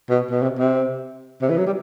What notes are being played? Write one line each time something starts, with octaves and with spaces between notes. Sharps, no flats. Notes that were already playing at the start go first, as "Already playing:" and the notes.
B2
B2
C3
C3
C3
E3
F#3
G3